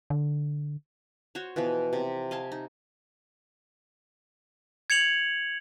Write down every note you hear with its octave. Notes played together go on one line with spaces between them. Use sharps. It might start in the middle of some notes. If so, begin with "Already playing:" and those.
D3
F#4 C5 C#5
B2 E3 F3 B3
C3
D#5 F5 G#5 A5
D#4
G#6 C#7 F7 F#7